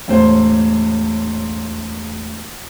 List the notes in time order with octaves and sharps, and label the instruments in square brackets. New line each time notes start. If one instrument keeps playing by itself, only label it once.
[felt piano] E1 A2 C5